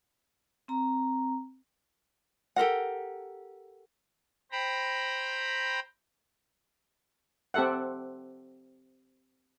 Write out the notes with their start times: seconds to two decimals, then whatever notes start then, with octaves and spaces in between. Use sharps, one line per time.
0.68 C4 A#5
2.56 G4 A4 A#4 F#5
4.52 C5 G5 A#5 B5
7.54 C4 G4 A4 E5 F#5